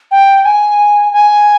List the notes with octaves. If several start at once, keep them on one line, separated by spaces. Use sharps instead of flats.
G5
G#5
G#5